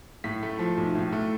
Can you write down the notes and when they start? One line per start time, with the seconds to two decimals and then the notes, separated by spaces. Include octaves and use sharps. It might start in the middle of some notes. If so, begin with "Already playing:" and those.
0.24 A2 B6
0.43 A3
0.59 F3
0.77 B1
0.95 A2
1.12 A3